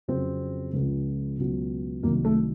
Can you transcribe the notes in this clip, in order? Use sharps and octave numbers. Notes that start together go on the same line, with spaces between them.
F2 C#3 F#3 C4
C#2 C#3 F3
C#2 B2 F#3
C2 C3 D#3 F#3 A#3
A3